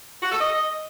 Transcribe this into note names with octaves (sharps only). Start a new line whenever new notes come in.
F#4
A4
D#5